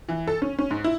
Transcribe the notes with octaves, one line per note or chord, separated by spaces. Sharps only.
E3
A4
C#4
C#4
G#2
E4